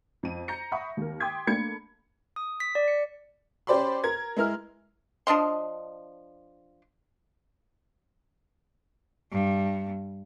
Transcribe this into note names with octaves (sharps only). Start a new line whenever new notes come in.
F2 D#7
A#5 G6 A#6 C#7
E5 F#5 B5 C#6 D#6
D#2 A#4
G5 C6 D6 D#6 G#6 B6
A3 A#3 D4 B5 G#6 C#7
D#6
B6
D5
C#7
C#4 G4 C5 D5 B5 C6
A#4 G#6
G#3 E4 A#4 F6
F3 D4 D#5 C6
G2